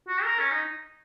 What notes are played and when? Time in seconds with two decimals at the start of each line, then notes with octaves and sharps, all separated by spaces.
0.08 F#4
0.24 A#4
0.39 C#4
0.51 D#4